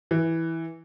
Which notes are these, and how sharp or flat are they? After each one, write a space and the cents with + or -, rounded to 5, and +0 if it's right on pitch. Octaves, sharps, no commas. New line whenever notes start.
E3 -5